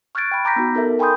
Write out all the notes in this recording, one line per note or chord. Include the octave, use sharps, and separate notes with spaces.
C#6 F6 F#6 G#6 A6 D7
G5 B5
A#5 D6 G6 A#6 B6
B3 D#4 F#4
D#4 A4 A#4 E5
G5 G#5 B5 C6 D#6 G6